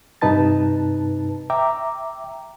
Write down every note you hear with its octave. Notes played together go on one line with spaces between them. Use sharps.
G2 C3 D#4 B4 A5 A6
E5 G5 A#5 D6